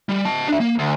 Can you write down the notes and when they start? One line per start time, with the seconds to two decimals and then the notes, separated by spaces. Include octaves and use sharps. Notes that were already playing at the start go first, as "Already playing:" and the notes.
0.09 G3
0.25 D#5 A5
0.48 D4 E5
0.60 A#3
0.79 D2